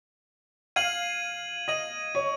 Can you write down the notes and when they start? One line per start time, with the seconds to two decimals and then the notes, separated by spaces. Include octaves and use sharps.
0.76 F5 G#6 D#7 F#7
1.68 D#5 G#6 D#7 F#7
2.15 C#5